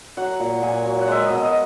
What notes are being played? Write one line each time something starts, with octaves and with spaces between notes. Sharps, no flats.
F#3 F#5
A#2
A#2 G#5
F#3
F#5
G#3 E5
D#5
B2
D#5